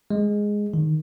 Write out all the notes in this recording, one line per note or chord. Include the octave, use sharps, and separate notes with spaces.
G#3
D#3